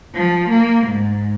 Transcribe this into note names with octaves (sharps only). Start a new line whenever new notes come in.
F3
A#3
G#2